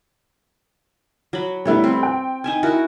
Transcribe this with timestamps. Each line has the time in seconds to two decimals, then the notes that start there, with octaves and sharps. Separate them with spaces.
1.33 F#3 B5
1.65 F#3 G3 A3 B3 E4 C#5
1.84 C4
2.03 G5
2.44 D#4 E5 G#5
2.63 E4 F#4 A#4